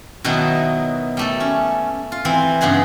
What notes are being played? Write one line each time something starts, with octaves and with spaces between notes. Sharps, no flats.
B2 D#3 F#3 D#4 E4
G3 A3 A4
C#4
F4
E3 C4
G2 C#3 B3 D#4 G#4